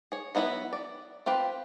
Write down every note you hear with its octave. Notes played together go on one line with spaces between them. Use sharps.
G#4 C#5
F#3 B3 E4 F4 B4
D5
C4 F4 G4 B4